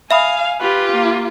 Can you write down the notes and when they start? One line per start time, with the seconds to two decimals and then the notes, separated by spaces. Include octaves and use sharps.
0.11 E5 F5 G#5 B5 D#6
0.61 F4 G4 B4
0.92 A#3